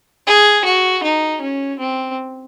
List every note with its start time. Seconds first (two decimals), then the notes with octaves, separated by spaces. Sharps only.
0.27 G#4
0.65 F#4
1.03 D#4
1.41 C#4
1.79 C4